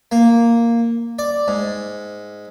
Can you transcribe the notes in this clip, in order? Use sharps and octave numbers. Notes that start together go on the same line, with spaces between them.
A#3
D5
G#2